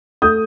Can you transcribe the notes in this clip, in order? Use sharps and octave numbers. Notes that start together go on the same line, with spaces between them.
A3 D#6 G6